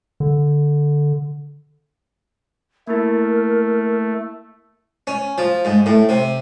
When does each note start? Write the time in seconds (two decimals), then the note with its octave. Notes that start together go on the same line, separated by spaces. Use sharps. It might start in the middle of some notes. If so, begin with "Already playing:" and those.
0.20 D3
2.87 A3 A#3 E4 A#4
5.07 C#4
5.38 F3
5.65 G#2
5.86 A2
6.09 C3